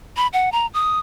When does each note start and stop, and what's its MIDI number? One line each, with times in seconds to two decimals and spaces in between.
0.17 0.27 83
0.33 0.52 78
0.52 0.67 82
0.74 0.99 87